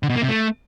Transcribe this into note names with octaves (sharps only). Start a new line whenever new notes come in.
D3
B2
A#3
C3
A3